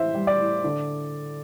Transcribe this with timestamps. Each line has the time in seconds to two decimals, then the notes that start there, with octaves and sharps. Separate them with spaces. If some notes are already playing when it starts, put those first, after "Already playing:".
Already playing: A2 E3 C5 E5
0.14 G3
0.27 D5
0.39 A2
0.64 D3